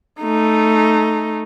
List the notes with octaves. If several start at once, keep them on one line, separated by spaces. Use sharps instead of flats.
A3 D#4